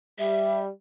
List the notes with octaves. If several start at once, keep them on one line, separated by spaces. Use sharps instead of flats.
G3 E5